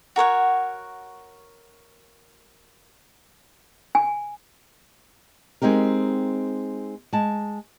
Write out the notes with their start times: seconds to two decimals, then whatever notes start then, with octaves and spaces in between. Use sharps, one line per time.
0.16 F#4 A#4 C#5 F#5
3.95 G#5
5.62 G#3 C4 D#4 G4 A#4
7.13 G#3 A5